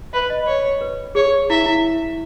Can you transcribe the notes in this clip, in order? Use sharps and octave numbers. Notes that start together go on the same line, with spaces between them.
B4 E5
D#5
C#5
B4
G#4 C#5
E4 E5
E4